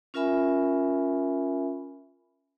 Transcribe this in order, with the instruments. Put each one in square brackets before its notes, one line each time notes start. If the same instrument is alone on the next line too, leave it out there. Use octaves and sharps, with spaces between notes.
[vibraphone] C#4 F4 A#4 E5 G#5 B5